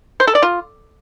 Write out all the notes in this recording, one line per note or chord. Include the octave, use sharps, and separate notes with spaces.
C5
A4
D5
F4